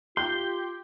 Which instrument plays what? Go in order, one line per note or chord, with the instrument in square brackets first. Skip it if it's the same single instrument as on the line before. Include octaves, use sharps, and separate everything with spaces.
[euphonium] F4 [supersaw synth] G4 [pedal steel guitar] C6 [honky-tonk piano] G6